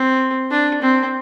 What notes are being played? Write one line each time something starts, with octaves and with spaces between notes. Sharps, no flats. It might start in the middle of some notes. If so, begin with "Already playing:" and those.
Already playing: C4
D4
C4